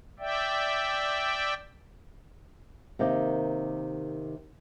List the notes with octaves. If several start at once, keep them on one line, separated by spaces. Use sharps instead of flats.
D5 E5 G5
C3 D#3 A#3 G4